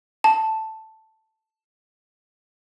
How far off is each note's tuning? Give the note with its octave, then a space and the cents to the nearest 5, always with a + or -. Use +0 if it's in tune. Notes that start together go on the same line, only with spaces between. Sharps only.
A5 +0